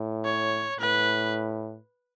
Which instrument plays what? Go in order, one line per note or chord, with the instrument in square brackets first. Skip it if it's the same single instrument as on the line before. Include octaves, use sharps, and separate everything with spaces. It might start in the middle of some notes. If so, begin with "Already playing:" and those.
Already playing: [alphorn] A2
[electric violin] C#5
[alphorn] A2 [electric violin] B4